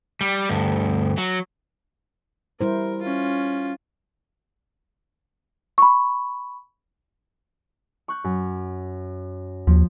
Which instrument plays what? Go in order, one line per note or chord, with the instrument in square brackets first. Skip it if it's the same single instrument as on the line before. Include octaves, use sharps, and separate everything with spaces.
[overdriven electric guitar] G3
D2 G2
F#3
[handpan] G3 E4 C5 [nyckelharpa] A#4
[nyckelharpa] C#4 F4
[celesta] B5 C#6
[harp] C#6 F#6 G6
F#2
[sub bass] D#2 [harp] F3